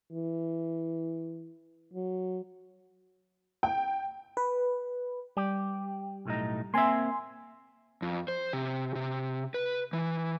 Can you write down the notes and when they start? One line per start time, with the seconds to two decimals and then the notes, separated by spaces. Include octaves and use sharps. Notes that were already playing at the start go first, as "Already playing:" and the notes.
0.12 E3
1.93 F#3
3.63 G5
4.37 B4
5.37 G3 G4
6.25 B1 A2 D#4
6.74 A#3 C4 E5 G#5 C6
8.02 F2
8.28 C5
8.53 C3
8.95 C3
9.54 B4
9.93 E3